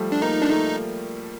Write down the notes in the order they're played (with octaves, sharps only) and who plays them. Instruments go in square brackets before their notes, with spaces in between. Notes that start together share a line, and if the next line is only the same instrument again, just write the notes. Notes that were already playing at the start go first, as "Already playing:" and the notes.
Already playing: [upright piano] F3 G3 A3
[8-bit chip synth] D4
[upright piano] A#3 [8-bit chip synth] D#4
[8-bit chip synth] D4
[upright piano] A3 [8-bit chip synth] D#4